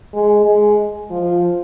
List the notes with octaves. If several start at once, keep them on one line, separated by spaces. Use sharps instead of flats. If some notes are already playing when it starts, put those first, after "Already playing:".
G#3
G#3
F3